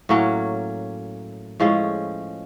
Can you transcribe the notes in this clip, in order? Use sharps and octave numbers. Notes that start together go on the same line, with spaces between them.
A2 F#3 A#3 C#4
A2 F3 G#3 C#4